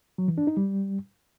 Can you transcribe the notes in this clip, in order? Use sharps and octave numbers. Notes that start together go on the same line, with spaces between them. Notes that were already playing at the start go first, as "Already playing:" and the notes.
F#3
E3
D4
D#4
G3